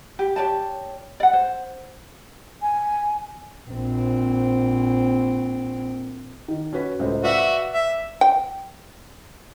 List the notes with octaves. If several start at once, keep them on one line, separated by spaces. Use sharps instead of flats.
G4
G4 C#5 D5 A5
D5 F#5
C5
G#5
A#1 C4
D#3
C#4 F#4 B4
C#2 A2 C5
F#4 B4 D5 E5 F5
E5
G5